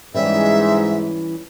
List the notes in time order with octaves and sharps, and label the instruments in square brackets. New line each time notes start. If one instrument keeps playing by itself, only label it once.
[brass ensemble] G#2 [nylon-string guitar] E3 G3 C#4 [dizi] E5